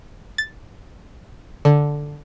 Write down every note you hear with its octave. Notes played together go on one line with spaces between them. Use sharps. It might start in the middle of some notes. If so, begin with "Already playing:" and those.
A6
D3